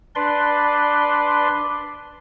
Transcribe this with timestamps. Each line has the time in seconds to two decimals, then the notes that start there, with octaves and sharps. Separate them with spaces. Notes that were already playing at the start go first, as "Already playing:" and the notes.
0.15 D4 B4 D5 C6